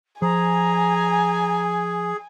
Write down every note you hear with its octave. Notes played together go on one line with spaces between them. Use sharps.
F3 G#4 G#5 A#5